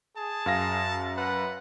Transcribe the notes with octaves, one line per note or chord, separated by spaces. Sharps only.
G#4 A5
F#2 F5 A#6
B4 F#5